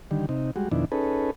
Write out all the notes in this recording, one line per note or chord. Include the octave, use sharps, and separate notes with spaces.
D3 D#3 G3
C3 D#4
G3 G#3 F#4
F2 B2 D#3 D4 E4
C#4 D#4 G#4 A4 B4